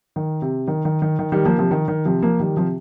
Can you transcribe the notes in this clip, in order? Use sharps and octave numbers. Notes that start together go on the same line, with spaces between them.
D#3
C3
D#3
D#3
D#3
D#3
D#3 G3
F3 A#3
C3 F3
D#3
D#3
C3 F3
F3 A#3
D#3 G3
C3 F3